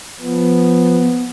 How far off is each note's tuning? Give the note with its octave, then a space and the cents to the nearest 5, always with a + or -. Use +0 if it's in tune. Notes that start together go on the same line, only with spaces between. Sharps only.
F3 +0 B3 +0